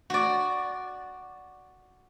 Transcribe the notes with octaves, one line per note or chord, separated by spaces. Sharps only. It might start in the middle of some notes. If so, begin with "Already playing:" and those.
F#4 D5